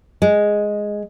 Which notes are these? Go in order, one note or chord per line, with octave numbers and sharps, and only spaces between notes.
G#3